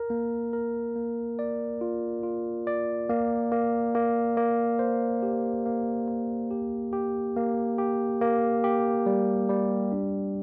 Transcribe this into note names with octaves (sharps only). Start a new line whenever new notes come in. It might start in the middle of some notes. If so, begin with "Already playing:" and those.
Already playing: A#4
A#3
A#4
A#3
D5
F4
F4
D5
A#3
A#3
A#3
A#3
C5
G4
A#3
A#3
G4
G4
A#3
G4
A#3
G4
G3
G3
D4